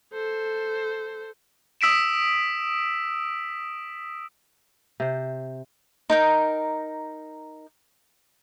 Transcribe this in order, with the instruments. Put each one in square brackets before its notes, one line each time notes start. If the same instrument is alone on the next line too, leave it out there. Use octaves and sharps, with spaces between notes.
[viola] A4 C5
[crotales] D#6 E6 B6 D7 E7
[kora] C3 C5
[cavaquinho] D#4 A#4 G5